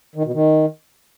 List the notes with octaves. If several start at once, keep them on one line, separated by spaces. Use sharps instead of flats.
D#3
B2
D#3